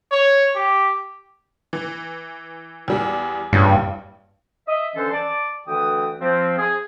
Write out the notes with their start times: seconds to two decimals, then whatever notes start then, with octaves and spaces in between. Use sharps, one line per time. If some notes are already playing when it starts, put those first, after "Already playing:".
0.11 C#5
0.55 G4
1.73 E3
2.88 E2 G3
3.53 A1 G2 A#2 C#3
4.67 D#5 E5
4.96 D3 E3 C#4 A4 C5
5.11 D5 A5
5.67 D2 E3 G5 D#6
6.21 F3 C4
6.58 G#4